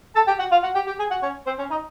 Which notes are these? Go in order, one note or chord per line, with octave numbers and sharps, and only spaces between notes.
A4 A5
G4 G5
F#4 F#5
F4 F5
F#4 F#5
G4 G5
G4 G5
G#4 G#5
F#4 F#5
C#4 C#5
C4 C5
C#4 C#5
D#4 D#5